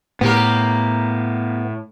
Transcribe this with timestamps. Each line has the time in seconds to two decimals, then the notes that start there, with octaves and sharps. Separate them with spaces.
0.21 A2 A#3 B3 G4 A#4